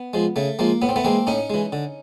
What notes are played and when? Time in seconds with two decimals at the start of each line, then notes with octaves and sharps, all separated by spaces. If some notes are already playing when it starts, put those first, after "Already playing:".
Already playing: B3
0.14 F3 G#3
0.36 C#3 A3
0.59 F3 G#3 A#3
0.82 A2 B3
0.89 C4
0.96 A3 B3
1.04 E3 G#3 A#3 C4
1.27 A2 C#4 D#4
1.50 E3 G#3
1.73 D3